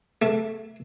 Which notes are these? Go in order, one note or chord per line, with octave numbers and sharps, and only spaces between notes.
A3